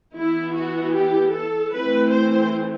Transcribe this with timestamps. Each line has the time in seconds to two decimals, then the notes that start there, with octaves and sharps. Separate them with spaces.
0.16 E3 B3 E4
0.55 F#4
0.94 G4
1.33 A4
1.71 E3 A3 C4 B4
2.11 C5